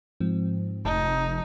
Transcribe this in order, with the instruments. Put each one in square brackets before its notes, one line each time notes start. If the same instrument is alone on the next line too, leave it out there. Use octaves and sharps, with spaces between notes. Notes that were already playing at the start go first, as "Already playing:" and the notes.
[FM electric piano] G#2 F3 C4
[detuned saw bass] F1 [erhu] D#4 [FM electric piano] A5